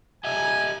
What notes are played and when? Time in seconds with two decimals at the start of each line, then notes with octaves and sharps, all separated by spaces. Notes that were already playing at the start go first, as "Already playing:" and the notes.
0.24 G4 D#5 E5 G#5